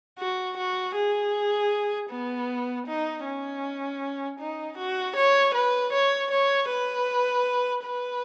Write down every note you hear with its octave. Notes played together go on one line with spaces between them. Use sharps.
F#4
F#4
G#4
B3
D#4
C#4
D#4
F#4
C#5
B4
C#5
C#5
B4
B4